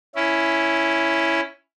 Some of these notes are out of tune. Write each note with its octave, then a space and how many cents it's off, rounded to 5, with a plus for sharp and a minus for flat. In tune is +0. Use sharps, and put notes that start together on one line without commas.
C#4 +5 E4 +0